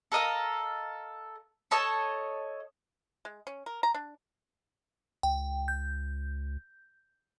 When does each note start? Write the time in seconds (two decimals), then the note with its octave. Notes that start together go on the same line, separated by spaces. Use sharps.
0.12 A4 A#4 D#5 F5
1.71 A4 C#5 D#5 A5
3.25 G#3
3.47 C#4
3.66 A#4
3.83 A#5
3.94 D4
5.23 C#2 G5
5.68 G6